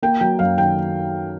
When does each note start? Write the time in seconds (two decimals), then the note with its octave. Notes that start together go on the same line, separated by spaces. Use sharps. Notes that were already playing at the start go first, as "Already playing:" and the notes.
0.02 A#3 G5
0.21 F#3 G5
0.39 F#2 F5
0.57 D#3 G5